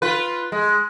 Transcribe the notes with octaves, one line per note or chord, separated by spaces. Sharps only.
F4 B4
G#3